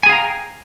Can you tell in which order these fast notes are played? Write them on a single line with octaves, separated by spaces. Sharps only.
G#5 G#4 F5 A#5 G5